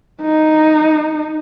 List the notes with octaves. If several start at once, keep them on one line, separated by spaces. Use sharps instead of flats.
D#4